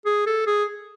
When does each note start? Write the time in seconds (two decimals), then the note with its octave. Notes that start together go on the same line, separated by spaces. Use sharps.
0.06 G#4
0.26 A4
0.46 G#4